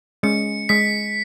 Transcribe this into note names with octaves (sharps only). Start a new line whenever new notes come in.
G#3 C#4 C#7
G#3 B6